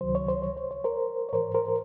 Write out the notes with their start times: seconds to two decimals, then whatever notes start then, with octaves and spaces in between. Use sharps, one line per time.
0.01 C#2 C3 D#3 F#3 C5
0.15 C#5
0.29 C5
0.42 C#5
0.57 C5
0.71 C#5
0.84 A#4 C5
1.29 C#5
1.33 G#2 E3 A#4 C5
1.55 A#4 C5
1.68 A#4